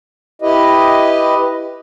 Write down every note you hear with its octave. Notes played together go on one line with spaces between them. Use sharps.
E4 G4 B4 D#5